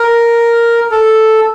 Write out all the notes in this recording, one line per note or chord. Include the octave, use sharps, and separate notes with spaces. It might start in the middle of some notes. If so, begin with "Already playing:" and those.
Already playing: A#4
A4